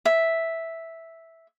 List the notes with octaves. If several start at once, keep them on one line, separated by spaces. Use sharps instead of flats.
E5